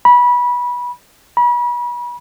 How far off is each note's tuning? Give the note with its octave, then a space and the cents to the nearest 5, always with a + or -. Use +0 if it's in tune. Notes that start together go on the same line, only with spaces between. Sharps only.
B5 -20
B5 -35